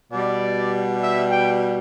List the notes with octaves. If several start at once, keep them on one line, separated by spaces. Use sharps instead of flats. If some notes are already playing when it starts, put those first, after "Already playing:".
B2 G3 D5
E5
G5